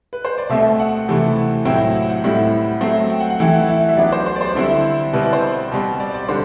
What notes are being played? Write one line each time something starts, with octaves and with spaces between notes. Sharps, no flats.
B4
C5
D5
B2 A3 C4 E5
F#5
C3 E3 A3 C4 E4
A2 F#3 C4 E4 G5
F#5
F#5
A2 G3 C4 E4
F#3 A3 C4 E5
G5
F#5
F#5
E3 A3 E4 G5
F#5
E5
E5
F#3 B3 D4 D5
C5
C5
D5
C5
D3 G3 C4 E4
B2 G3 C4 E4 B4
D5
C5
B2 G3 C4
D5
D5
D3 G3 C5